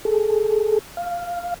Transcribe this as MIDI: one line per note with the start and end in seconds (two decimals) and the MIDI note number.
0.05 0.79 68
0.05 0.79 69
0.97 1.54 77